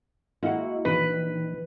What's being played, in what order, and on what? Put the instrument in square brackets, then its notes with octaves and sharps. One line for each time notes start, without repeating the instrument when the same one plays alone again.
[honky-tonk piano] G#3 E4 [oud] A#3 F#4
[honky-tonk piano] A#1 D#3 [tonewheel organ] E3 [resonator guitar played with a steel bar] B4